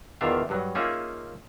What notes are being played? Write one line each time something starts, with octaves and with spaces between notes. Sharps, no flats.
E2 D#3 D4 F4 E5 F5
G2 F#3
A#3 C#4 D#4 F4 G#4 E5